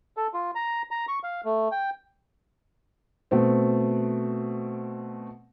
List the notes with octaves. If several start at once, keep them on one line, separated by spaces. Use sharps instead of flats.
A4
F4
A#5
A#5
C#6
F5
A3
G5
B2 A3 C4